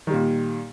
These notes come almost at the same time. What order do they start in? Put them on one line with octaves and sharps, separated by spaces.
D#3 G3 A#2